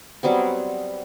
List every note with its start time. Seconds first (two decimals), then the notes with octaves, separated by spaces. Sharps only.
0.23 F#3 G3 B3 C4